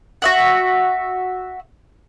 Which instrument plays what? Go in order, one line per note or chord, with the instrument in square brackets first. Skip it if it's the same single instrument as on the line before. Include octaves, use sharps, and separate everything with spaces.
[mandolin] F#4 E5 F#5